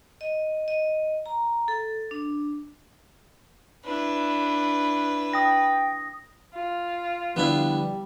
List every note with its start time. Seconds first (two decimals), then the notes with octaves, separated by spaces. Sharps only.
0.21 D#5
0.68 D#5
1.26 A#5
1.68 A4
2.11 D4
3.84 D4 E4 B4
5.33 G5 D#6 A#6
6.55 F4
7.36 D3 F3 G3 B3 D4 E4